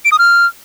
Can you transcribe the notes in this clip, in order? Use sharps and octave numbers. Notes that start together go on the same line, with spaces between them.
D7
D#6
F6